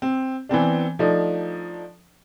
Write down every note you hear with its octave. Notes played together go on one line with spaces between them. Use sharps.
C4
E3 B3 C4 D4
F3 A3 D4 D#4